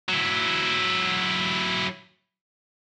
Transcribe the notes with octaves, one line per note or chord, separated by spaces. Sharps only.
F#3 E4